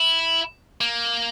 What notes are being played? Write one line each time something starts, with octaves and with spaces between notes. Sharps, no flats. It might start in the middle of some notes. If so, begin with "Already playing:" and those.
Already playing: E4
A#3